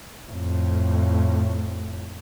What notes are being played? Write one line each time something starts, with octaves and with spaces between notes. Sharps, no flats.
F2 A2